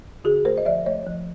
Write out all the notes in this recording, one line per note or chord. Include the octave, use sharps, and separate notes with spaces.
D3 F#4 G#4
A3 A#4 C5
D#5
F3 D5 E5
A3 C#5 D#5
F3